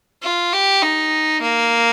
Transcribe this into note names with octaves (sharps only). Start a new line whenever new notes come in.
F4
G4
D#4
A#3